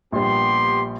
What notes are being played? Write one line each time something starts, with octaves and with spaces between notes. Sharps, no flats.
A#1 G3 B3 G4 C6